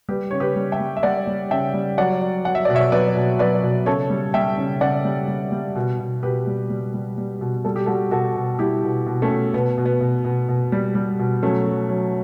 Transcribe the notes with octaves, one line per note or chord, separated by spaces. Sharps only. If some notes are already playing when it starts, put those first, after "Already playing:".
G3 G4 B4
C#3 C#5
G4 B4
G3
E5 G5
G3
E5
G3 D5 F#5
G3
C#3 E5 G5
G3
F#3 D5 F#5
F#3
F#3 F#5
E5
B2 D5
C#5 E5
F#3 B4 D5
B2
F#3 B4 D5
B2
C#3 A4 C#5
G3
G3 E5 G5
C#3
C#3 D5 F#5
G3
G3
G3
B2
B2
B2 G4 B4
G3
G3
G3
G3
B2
G3 A4
G4
G3 F#4 A4
B2 F#4 A4
B2
G3 E4 G4
B2
B2
A3 C#4
B2
B2 B3
B2
B3
B2
B2
B2
G3
G3
B2
F#3 A3 C#4
F#3
F#3